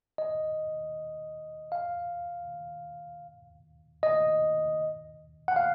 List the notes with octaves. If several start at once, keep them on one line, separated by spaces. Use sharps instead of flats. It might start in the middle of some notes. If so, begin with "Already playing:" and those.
D#5
F5
D#5
F#5
F5